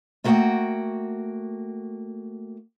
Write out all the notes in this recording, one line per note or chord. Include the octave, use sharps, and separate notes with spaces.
A3 A#3 F#4 D#5 F#5 G5